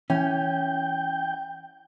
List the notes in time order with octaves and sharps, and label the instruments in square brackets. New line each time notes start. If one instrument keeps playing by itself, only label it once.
[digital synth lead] E3 [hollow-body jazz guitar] C#4 [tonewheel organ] G5